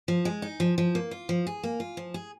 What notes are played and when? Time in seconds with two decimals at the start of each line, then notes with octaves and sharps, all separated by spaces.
0.08 F3
0.25 G#3
0.42 D#4
0.60 F3
0.78 F3
0.95 A#3
1.11 F4
1.29 F3
1.47 G#4
1.63 A#3
1.80 F4
1.97 F3
2.14 G#4